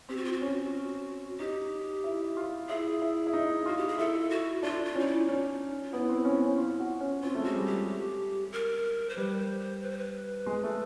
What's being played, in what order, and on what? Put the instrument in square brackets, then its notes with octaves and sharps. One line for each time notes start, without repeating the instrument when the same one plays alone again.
[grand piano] C4 [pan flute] G4
[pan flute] F#4
F4
F#4
[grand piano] C#4
[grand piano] D#4 [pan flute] G4
[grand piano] E4
F4
[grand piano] E4 [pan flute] G#4
[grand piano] E4
E4
D#4
[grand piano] F4 [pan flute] F#4
[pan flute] G4
G#4
[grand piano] E4 [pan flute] A4
[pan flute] F#4
[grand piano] D4 [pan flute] F4
[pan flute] F4
[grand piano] C#4 [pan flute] D#4
[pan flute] E4
[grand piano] C#4 [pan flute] D#4
[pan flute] F4
[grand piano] B3 [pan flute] E4
[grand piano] C4
C#4
C#4
F4
F#4
C#4
[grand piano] C4 [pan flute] F4
[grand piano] A3
G#3
[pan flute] F#4
[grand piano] G3
[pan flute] G4
A#4
C5
[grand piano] G3 [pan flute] B4
[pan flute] C5
C5
B4
C5
B4
[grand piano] G#3
A3